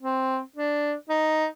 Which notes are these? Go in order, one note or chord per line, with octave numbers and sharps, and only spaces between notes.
C4
D4
D#4